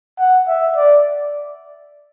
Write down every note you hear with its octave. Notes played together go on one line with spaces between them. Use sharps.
F#5
E5
D5